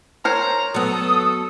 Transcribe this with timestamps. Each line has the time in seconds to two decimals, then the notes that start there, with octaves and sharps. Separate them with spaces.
0.25 A#4 C5 C#5 A#5
0.74 F#3 B3 A4 D#6